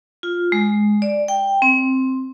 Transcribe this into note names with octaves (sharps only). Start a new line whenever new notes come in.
F4
G#3
D5
G5
C4